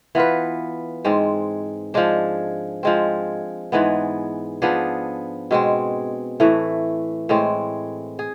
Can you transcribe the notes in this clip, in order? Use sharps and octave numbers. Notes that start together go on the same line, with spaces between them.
E3 B3 F4 B4
G#2 G#3 C4
F3 G#3 D4
F3 G#3 C4
G#2 E3 G#3 B3
F3 B3 D4 G#4
B2 G#3 C4
A2 E3 A3
A2 G#3 C4
G#4